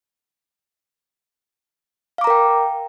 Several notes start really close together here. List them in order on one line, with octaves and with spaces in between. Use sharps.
F5 D6 A#5 A#4 G5